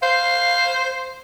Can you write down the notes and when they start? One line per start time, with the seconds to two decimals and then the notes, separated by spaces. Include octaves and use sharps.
0.02 C5 F5